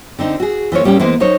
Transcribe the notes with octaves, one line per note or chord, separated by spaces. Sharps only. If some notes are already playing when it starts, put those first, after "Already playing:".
D3 C4 D#4
F#4 G#4
E3 F3 A#3 C#5
A2 G3 A#3 C#4 G4
E3 G#3 A#3 B3 C5
F#3 D#4 C5 C#5